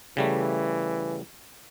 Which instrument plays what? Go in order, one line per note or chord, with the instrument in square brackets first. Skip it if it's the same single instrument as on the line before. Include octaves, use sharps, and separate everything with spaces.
[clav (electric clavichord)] C#3 G3 A3 [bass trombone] E3